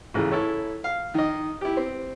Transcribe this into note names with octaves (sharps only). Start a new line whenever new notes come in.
A1 C#3 E3
E4 A4 C#5
F5
D#3 D#5
E4 G4
C4